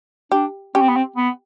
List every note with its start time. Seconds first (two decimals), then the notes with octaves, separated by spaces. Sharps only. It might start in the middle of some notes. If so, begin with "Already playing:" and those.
0.32 D4 G4
0.75 C#4 G4
0.81 C4
0.89 B3
0.96 C4
1.16 B3